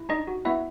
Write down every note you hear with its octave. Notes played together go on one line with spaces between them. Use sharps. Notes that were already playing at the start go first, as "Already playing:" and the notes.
Already playing: E4
D4 D#4 D#5
F#4
B3 E4 E5